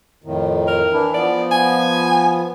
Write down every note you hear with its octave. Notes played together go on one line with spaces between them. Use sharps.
F2 A2 D#3
A#4
E3 D4 E4
F3 B3 D5
G#5